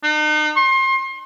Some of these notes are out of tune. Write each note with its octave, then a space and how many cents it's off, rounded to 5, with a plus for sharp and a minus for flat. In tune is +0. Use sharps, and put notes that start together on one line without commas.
D#4 -40
C6 +35